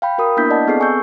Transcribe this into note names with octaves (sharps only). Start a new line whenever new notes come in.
F5 G5 B5
F#4 A#4 B5 D#6
A#3 B3 D4 E4 G6 B6
D5 D#5 F#5 A5
B3 C4 G#4 A4 C7
G#5 C#6 E6 G6